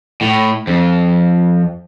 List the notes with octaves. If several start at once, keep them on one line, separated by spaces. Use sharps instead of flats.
A2
F2